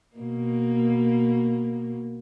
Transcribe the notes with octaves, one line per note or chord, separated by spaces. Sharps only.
B2 A#3